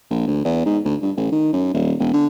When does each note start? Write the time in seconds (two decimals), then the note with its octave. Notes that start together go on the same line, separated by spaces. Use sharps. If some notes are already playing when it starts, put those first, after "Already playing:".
0.10 A#1
0.27 D2
0.45 E2
0.66 G#2
0.85 D2
1.02 G2
1.17 A1
1.32 D#3
1.53 F#2
1.74 D#1
2.00 E1
2.13 D3